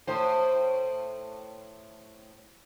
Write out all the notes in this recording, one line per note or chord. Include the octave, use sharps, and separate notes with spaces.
A2 C5